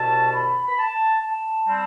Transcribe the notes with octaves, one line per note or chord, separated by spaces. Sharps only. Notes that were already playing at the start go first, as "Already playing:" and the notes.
Already playing: C2 B2 A3 A5
B5
B5
A5
A5
G3 C4